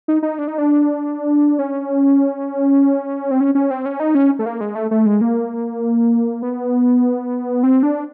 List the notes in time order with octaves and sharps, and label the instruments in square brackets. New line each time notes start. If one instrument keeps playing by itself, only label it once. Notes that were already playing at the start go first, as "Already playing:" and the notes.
[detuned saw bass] D#4
D#4
D4
D#4
D4
C#4
C4
C#4
C#4
C4
C#4
D#4
C#4
A3
A#3
G#3
A3
A3
G#3
A#3
B3
C4
D4